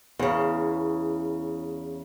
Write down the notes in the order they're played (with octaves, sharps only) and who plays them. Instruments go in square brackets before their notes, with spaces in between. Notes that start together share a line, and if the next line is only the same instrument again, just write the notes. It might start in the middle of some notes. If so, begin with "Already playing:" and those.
[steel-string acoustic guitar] E2 C#3